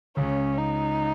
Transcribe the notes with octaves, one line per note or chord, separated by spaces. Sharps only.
C#2 C#3 C#4
D#4